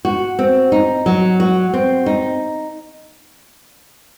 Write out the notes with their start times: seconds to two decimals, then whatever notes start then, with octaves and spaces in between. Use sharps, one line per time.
0.05 F#4
0.39 C4
0.72 D#4
1.06 F#3
1.40 F#4
1.73 C4
2.06 D#4